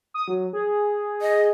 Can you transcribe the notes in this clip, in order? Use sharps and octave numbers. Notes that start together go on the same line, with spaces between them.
D#6
F#3
G#4
D#5